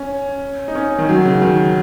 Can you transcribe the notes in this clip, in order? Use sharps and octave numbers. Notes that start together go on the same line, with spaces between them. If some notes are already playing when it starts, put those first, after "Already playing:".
Already playing: C#4
D#4
C#4
D#3
F#3
C#3
D#3